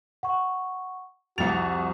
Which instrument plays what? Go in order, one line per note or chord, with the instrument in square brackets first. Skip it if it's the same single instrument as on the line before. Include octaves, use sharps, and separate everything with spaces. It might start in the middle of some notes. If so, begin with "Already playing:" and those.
[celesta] F#5 C#6
[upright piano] C2 F7 [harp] F2 C#7 [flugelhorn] F#4 [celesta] A6